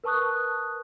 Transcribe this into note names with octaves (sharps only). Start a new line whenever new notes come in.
A#4 B4 A5 C#6 D#6 F#6